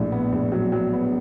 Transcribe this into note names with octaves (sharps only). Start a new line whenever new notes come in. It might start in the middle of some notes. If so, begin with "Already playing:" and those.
Already playing: A#1 A2
B3
A#1
F#3
F#3
B3